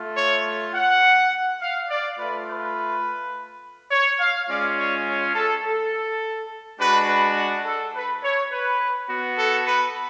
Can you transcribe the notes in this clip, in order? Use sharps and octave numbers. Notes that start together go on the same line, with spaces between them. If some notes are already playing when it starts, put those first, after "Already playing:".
Already playing: A3 F4
C#5
F#5
F5
D5
A3 F4 B4
B4
C#5
F5
G#3 C#4 F4 D5
C#5
C#5
A4
A4
G#3 D4 F#4 B4
B4
A4
B4
C#5
B4
B3 F#4
A4
B4